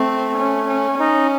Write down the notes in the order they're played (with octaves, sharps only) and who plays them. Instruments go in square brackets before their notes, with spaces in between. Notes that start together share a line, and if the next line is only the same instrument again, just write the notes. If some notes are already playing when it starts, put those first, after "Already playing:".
Already playing: [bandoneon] A3 [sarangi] C4
[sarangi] C#4
C#4
[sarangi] C#4 [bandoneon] D#4